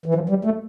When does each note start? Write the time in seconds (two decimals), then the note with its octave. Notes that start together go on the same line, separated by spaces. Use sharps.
0.06 E3
0.15 F3
0.29 G3
0.45 A3